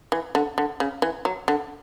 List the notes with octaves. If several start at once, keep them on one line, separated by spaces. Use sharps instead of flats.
E3
D3
D3
C#3
E3
F#3
D3